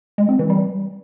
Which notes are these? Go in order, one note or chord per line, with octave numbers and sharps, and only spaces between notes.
G#3
C4
E3
G3